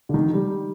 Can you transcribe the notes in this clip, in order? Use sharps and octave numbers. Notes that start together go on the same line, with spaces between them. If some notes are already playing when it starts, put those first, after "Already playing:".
D3
D#3
G3